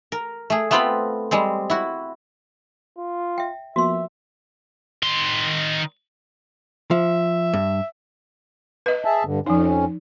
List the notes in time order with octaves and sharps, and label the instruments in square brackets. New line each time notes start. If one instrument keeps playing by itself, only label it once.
[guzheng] A#4
A3 G#4
A3 B3 C4 F4 G5 B5
G3 G#3 C4
E4 F#4
[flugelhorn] F4
[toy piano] E5 G5
[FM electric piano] F3 A#3 B3 [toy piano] F#4 C6 [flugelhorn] E5
[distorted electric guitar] D#3 C6
[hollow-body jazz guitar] F3 [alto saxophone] E5
[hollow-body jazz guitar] G2
[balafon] B4 D#5
[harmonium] G#4 E5 A5
G2 D3
[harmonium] F2 C#4 [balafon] F3 D#4